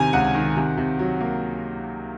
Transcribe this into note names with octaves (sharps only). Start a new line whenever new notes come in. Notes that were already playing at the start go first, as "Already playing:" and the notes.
Already playing: C3 D#3 G#5 A#5
C#2 F#5
D#3
C3
C3
F#3
A#3